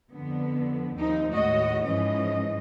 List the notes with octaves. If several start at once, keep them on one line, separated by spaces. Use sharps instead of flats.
F2 D3 B3
D#2 F3 C4 D#4
D#2 A2 G#3 F#4 C#5 D#5
G#2 E3 F3 C#4 D#5